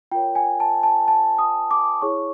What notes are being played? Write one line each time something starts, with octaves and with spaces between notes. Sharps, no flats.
F4 A#4 C#5 G5
G#5
A5
A5
A5
D#6
D6
E4 G#4 C#5 C#6